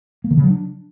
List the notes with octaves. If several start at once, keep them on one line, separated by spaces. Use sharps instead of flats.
A#3
D#3
C#3
F#3
D4